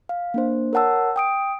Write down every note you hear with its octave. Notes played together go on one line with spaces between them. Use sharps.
F5
A#3 D4 C5
A#4 C#5 F#5 A5 E6
G5 D#6 D7